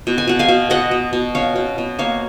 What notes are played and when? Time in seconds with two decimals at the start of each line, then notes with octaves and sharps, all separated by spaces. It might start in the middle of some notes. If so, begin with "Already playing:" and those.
0.07 B2
0.18 G#5
0.28 B2 F#5
0.39 F5 G#5
0.48 B2
0.70 B2 D#5 F#5
0.91 B2
1.13 B2
1.35 C#4 C#5 F5
1.56 B2
1.78 B2
1.99 A#3 C#5 F5